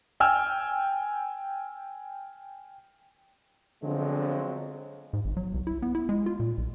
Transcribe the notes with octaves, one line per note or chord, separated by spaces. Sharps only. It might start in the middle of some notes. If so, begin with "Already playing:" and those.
G5 G#5 E6 F6
D3 F3 F#3 G#3 B3 C4
G#2
G#1
F#3
C2
E4
B3
E4
G#3
F4
A#2
B1